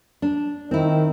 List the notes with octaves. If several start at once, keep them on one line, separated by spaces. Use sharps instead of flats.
D4
D#3 C4 E4